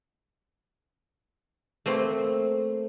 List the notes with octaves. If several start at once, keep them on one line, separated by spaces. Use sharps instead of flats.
A3 A#3 C4